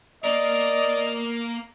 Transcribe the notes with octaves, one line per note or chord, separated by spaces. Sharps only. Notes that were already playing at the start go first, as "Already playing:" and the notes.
A#3 A#4 D5 D#5